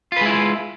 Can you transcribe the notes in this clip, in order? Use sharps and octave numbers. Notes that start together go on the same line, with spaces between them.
G#3 E4 F4 B4